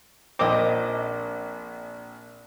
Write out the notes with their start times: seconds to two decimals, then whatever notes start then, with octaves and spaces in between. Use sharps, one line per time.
0.39 A#1 A#2 C4 D#5 D6